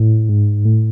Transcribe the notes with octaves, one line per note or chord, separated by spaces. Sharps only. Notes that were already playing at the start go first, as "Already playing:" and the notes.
Already playing: A2
G#2
A2